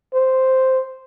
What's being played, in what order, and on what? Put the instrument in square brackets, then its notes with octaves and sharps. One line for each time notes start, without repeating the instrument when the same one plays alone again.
[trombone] C5